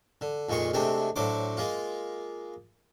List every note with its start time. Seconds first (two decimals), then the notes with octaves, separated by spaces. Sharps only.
0.21 D3
0.49 F2 A#2 D#3 G#3 C6 C#6
0.73 C3 G#3 A3 C4 D4
1.16 A2 D3 F#3 C5 D6
1.57 G#3 A#3 F4